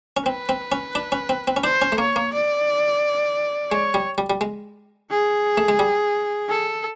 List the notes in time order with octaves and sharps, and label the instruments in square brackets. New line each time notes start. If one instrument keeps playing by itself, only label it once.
[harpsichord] C#4
[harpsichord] C4 [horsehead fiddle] B4
[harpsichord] C4
C#4
D4
C#4
C4
C4
C#4
[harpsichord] D4 [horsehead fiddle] C5
[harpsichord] C#4
A3
[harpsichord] A#3 [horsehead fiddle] C#5
[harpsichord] A#3
[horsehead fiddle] D5
[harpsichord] G#3 [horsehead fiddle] C#5
[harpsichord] G3
G3
G3
G#3
[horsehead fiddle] G#4
[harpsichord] A3
G#3
G3
[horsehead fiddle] A4